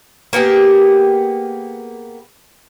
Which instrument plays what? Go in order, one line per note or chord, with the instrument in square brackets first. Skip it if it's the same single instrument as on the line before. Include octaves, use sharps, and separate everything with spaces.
[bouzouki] A#3 B3 G4 G#4